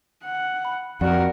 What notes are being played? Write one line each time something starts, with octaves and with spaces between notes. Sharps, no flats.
F#5
B5
F2 F#4 A#4 D5 F#5